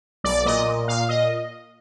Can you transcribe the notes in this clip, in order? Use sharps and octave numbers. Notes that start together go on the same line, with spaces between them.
B1 D5
A#2 D#5
A#2
A#2 F5
A#2 D#5